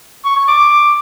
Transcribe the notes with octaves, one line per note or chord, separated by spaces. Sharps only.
C#6
C#6
D6